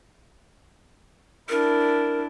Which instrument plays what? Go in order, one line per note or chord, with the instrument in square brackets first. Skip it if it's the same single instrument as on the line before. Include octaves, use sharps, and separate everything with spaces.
[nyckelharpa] D4 E4 [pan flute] A#4